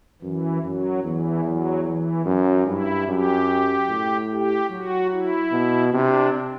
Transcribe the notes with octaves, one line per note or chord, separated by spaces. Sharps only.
F#2 E3
F#2 F#3
E2 E3
F#3
E3
F#2 F#3
G2 E4
F#2 G4
A2
G4
F#3 F#4
E4
B2
C3 D4